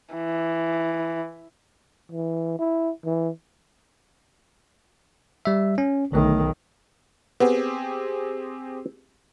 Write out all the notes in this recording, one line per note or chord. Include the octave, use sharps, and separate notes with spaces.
E3
E3
E4
E3
G3 E5
C#4
B1 D3 D#3 A3
B3 C4 G4 G#4